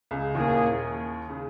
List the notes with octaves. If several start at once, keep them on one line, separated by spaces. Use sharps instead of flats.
C#2 C#3
D#2 A#2 D#3 A#3 E4 G#4
C#3